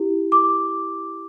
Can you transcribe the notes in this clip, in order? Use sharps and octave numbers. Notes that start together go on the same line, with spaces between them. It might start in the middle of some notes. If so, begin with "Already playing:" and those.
Already playing: E4 G4
D6